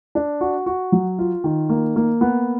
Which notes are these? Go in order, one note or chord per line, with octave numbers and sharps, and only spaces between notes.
D4
F#4
F#4
F#3
F4
D#3
A#3
A#3
B3